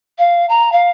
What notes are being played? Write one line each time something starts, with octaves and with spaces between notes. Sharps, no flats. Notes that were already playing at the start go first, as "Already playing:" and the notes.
F5
A#5
F5